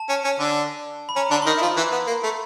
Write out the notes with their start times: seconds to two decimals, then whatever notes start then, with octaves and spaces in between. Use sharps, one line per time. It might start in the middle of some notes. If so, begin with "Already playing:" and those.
Already playing: A5
0.09 C#4
0.25 C#4
0.39 D3 D4
1.09 B5
1.16 C#4 A#5
1.31 D3 D4
1.42 C6
1.46 D#3 D#4 B5
1.57 E4
1.62 F3 F4
1.77 E3 E4
1.92 B3
2.07 A#3
2.23 A3